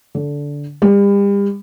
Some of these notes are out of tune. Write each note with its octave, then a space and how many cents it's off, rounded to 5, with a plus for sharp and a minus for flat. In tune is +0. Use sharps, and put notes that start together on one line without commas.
D3 -15
G3 +35